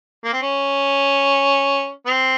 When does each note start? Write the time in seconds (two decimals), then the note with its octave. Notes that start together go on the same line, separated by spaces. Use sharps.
0.25 A#3
0.33 C4
0.42 C#4
2.06 C4